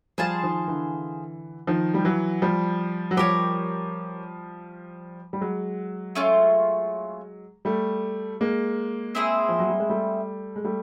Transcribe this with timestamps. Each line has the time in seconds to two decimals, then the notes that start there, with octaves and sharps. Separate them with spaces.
0.18 F3 G3 G#4 C5 F5 A5
0.43 D#3 F3
0.68 D3 E3
1.67 D#3 F3
1.94 G3
2.05 E3 F#3
2.42 F3 G3
3.11 F#3
3.17 F3 G3 G4 A#4 C#5
5.33 G3
5.41 F#3 G#3
6.15 A3 C#4 F4
7.65 G3 A3
8.41 G#3 A#3
9.15 C4 E4 G#4 C5
9.49 F3
9.59 F#3
9.69 G3
9.80 G#3
9.89 G3 A3
10.56 G#3
10.64 G3 A3